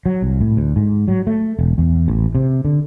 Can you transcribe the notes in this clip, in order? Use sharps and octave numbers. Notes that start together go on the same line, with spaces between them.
F#3
C2
A2
D2
G#2
F#3
A3
E1
E2
A1
C3
D3